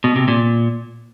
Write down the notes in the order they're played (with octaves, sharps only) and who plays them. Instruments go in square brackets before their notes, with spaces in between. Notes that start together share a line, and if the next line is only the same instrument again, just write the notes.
[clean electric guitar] B2
C3
A#2